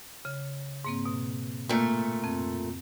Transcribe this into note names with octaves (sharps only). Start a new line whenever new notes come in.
C#3
G#2 A#3 C4
B2
A#2 A3
F2 C4